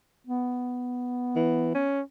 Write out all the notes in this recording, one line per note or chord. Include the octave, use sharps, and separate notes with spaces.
B3
E3
C#4